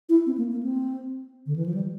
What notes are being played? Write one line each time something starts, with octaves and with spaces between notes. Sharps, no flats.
E4
C4
A#3
A#3
C4
D3
E3
F3
G3